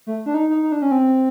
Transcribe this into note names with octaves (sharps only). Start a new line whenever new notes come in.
A3
D4
D#4
D#4
D#4
D4
C#4
C4